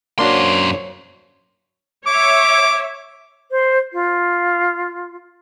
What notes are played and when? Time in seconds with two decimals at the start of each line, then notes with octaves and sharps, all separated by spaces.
0.19 F#2 A#3 D4 F#4 C5 C#5 C6
2.07 C#5 E5 D6
3.51 C5
3.93 F4